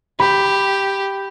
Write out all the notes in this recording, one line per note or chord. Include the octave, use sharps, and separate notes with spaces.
G4 B5